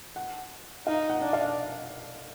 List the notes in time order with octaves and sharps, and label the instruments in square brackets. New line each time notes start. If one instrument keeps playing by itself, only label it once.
[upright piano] F#5
[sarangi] D#4 [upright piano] F5
[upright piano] F#5
[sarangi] D4
[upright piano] F5